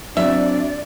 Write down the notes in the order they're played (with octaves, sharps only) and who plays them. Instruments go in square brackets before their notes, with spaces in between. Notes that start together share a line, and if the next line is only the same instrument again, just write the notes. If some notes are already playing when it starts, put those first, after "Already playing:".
[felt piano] F#3 C4 [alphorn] D4 [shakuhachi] D5 [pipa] E5